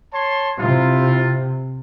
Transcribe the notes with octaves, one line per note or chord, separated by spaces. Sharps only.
C#5 A5 C6
C3 E4 F4